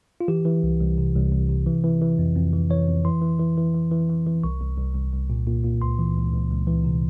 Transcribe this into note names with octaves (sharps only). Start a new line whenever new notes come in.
F4
E3 G4
E3
C2
C2
C3
C2
C2
C3
E3
E3
E3
F2
F2
E3
E3 C#5
F2
E3 C6
E3
E3
E3
E3
E3
E3
E3
C2 C#6
C2
C2
C2
C2
A#2
A#2
A#2
C#2 C6
E3
C#2
C#2
C#2
E3
C3